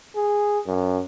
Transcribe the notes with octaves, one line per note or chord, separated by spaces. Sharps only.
G#4
F#2